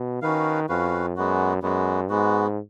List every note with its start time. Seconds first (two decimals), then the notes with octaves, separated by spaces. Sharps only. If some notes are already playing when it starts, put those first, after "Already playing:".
Already playing: B2
0.22 D#3 C#4 F#4 B4 F5
0.69 F2 C#4 F#4 B4 F5
1.16 F#2 G#3 B3 F#4
1.62 F#2 G#3 B3 F#4
2.09 G#2 G#3 B3 F#4